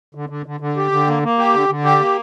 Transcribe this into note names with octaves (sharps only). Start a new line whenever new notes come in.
D3
D3
D3
D3
G4
D3
A#3
A#3
G4
D3
D3
G4
A#3